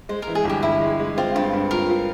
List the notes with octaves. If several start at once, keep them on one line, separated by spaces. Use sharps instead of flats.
G#3 C5
A#4
E3
G#4
G1
G4
G1 E4
G#3
G#3
C4 F4
G2 F4
G2
F4 A#4
F4